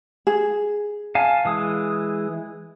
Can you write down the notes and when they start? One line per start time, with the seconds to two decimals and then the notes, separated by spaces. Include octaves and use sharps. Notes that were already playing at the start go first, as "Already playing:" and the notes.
0.27 G#4
1.15 F5 G#5 A5
1.45 E3 G#3 D#6